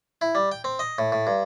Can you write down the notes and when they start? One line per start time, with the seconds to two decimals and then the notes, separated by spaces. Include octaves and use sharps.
0.21 E4
0.35 G3
0.52 G5
0.64 C4
0.79 D#5
0.98 A2
1.12 A2
1.27 G2